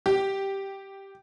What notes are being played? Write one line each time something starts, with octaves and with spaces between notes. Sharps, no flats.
G4